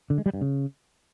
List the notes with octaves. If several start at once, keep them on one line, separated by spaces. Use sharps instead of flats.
D3
G#3
G3
G2
C#3